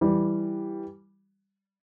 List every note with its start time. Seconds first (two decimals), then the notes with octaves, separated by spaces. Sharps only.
0.01 E3 G3